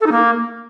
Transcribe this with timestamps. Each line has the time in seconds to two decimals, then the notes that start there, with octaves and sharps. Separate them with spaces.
0.01 A4
0.06 D#4
0.12 A#3